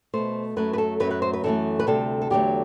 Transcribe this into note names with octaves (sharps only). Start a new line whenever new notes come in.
B2 A3 C5
F#2 F#3 A3 B4
B4
A4
F#2 F#3 A3 B4
B4
C5
B4
F#2 E3 A3 A4
B4
D2 C3 G3 A4
A4
E2 D3 F#3 A3 G4